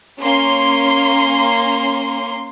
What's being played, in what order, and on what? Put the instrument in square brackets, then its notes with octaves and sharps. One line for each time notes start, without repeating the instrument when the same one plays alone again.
[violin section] A#3 C#4 C6